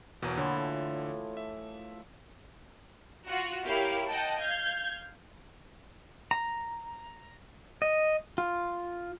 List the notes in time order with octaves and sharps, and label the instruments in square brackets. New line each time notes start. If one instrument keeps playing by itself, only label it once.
[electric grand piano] E2 B2 [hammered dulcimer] F#3 A#3
[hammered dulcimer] A2 E3 F3 [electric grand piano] D3
[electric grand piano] E5
[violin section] F4 F#4
A#3 E4 G4 C#5 F5
D#5 F#5 G5 A5
F5 G6 G#6
[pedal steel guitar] A#5
D#5
F4